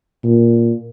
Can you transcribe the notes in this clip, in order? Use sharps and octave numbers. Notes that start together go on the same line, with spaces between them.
A#2